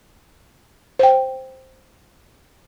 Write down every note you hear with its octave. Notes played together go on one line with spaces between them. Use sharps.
C5 G5